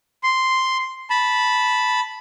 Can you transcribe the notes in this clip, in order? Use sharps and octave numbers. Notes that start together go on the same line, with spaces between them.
C6
A5 B5